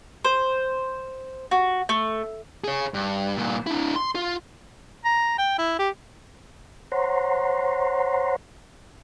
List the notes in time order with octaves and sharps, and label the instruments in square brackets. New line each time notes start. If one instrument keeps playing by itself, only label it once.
[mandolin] C5
F#4
A3
[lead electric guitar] G#4 C#5
G2
G2 A#2
D4 E4
C6
F4
[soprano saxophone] A#5
G5
E4
G4
[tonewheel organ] C5 C#5 F#5 A#5 C6